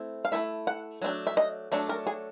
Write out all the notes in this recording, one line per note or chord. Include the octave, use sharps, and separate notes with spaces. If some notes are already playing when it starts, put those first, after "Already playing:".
Already playing: A3 C4 E4
F5
A3 C4 E4 E5
F#5
F#3 A3 D4
E5
D#5
F#3 A3 D4
A#4
G#4